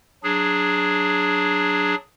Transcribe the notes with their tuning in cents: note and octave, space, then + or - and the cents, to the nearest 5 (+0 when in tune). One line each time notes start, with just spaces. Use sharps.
F#3 +0 D4 +0 G#4 +0